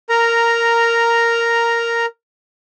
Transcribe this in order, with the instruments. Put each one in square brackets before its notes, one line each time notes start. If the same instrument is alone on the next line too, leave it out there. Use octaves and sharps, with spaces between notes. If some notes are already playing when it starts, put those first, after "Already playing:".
[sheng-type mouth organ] A#4 A#5